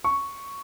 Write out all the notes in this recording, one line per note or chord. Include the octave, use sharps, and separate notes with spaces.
C#6